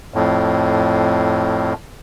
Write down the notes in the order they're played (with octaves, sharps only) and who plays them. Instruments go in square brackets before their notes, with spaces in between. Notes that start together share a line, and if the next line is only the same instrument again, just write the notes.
[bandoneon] F2 A2